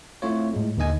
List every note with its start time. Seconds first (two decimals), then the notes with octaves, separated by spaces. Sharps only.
0.22 A3 C4 E4 F4 C#5
0.54 A2 G#3
0.77 D#2 D3 D#3 D#5 G#5 G#6